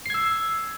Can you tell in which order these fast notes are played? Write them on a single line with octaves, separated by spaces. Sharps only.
C7 G#6 E6